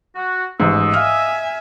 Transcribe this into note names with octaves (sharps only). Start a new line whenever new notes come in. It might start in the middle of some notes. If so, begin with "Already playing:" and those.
F#4
A1 G#2 D#5 E6
E5 F5 G#5 F6